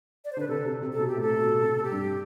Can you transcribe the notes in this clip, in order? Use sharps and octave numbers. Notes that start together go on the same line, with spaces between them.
D5
C5
D3 B4
C3 A4
C3
C3
A4
B2
G4
A2
A4
B2
C3
G4
G2